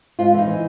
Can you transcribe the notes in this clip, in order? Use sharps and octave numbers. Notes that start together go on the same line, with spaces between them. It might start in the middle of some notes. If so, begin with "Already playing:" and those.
G#2 F4
E3
D#4
E3